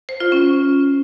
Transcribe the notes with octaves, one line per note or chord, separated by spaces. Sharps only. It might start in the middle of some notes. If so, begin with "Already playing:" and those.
C5
F4
C#4